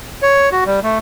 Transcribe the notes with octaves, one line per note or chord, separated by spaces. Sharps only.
C#5
F#4
G3
A3